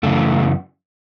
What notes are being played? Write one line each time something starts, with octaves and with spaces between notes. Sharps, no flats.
F#2 C#3 E3 A3